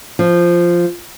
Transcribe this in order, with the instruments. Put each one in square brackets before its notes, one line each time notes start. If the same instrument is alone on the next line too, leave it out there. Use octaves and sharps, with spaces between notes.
[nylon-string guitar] F3